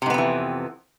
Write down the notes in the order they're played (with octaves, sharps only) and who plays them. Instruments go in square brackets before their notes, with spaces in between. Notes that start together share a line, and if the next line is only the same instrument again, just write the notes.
[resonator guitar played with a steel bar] C3
G#2
B3
F2
E3